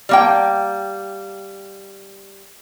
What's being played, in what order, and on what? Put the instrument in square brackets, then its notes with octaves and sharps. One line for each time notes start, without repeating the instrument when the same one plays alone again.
[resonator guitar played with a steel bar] G3 A#3 G5